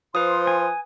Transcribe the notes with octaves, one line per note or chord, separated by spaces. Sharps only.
F3 B4 C5 C6 D#6
G#5